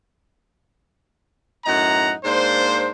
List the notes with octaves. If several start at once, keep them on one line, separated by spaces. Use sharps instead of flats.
F#2 A2 D#4 F#5 A#5
G#2 A#3 D4 C5